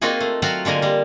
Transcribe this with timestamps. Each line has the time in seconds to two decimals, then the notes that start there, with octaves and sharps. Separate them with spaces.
0.01 A#3 C4 D#4 F4 F#4 G#4
0.21 A3
0.42 F#3 C4 F4 F#4 F5
0.65 D3 G#3 A#3 A#4 G#5
0.82 G3 A#3